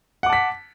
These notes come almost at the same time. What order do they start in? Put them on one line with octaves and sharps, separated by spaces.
F#5 D6 A5 B6